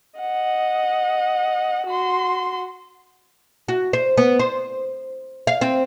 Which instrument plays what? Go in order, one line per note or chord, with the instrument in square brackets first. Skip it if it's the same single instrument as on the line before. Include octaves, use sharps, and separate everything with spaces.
[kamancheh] D#5 F#5
F#4 C6
[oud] F#4
C5
B3
C5
F5
C4